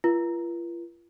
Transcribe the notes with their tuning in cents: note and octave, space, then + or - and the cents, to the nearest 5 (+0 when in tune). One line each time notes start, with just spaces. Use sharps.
F4 -40 B4 -45